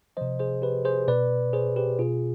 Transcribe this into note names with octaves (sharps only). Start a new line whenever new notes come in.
C3 F3 C5 D#5
G#4 C5
G4 B4
G#4 C5
B2 B4 D5
G#4 C5
G4 B4
B2 F4 G#4